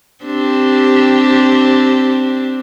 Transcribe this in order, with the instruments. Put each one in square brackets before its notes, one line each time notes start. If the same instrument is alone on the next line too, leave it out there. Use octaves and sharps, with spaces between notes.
[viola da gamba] C4 D4 G4